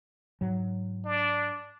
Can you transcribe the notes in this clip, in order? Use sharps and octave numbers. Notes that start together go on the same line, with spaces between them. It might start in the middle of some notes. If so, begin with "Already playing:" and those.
G#2 F#3
D4